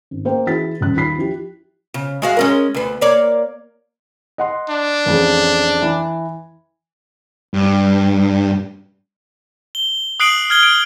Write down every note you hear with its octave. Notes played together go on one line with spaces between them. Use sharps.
G#1
A#3 C5 G5
E3 E4 F#4 G#4 A6 B6
D#1 A1 F#6
D#2 F4 B5 B6 C7
F3 E4 G4
C#3
G#3 F#4 F5
G#3 C#4 A#4
D2 B3
A#3 C#5 D5
D#5 F#5 C6
D4
A1 F2 G#4
E3
G2
G7
D#6 F#6 C7 D7 F#7
F6 G#6 G7
D7